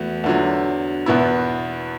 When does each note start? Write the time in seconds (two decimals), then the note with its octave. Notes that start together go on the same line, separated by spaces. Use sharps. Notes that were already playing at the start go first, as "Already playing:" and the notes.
Already playing: E2 E3 A3 F#4
0.24 E2 D3 F#3
1.06 E2 B2 B3 E4